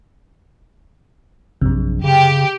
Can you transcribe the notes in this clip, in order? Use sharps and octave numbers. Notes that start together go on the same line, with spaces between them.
A#1 F#2 C3
C#3 G4